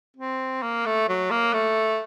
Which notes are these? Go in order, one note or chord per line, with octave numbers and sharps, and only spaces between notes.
C4
A#3
A3
F#3
A#3
A3